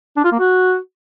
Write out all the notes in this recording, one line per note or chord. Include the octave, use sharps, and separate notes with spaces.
D4
F4
A#3
F#4